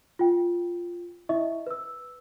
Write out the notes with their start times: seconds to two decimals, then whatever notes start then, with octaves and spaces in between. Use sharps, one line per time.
0.19 F4 G5
1.29 E4 D#5 E5 C#6
1.67 B4 E6